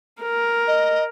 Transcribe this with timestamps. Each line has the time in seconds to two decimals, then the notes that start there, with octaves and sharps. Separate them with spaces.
0.23 A#4
0.67 D#5